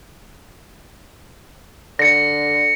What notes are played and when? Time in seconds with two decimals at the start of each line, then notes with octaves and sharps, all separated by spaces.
1.99 D3 A#6 C#7